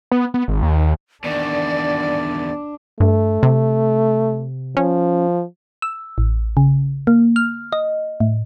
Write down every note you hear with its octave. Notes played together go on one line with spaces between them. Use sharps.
B3
B3
G#1
D#2
E2 D#3 D4 D5
G2 A3
C3
F3 C#4
E6
A1
C#3
A#3
F6
D#5
A2